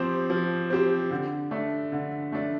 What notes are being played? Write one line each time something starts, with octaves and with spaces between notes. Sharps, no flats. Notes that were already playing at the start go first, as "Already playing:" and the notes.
Already playing: F3 C4 G4 C5
F3
C4 G4 C5
D3
A3 D4
D3
A3 D4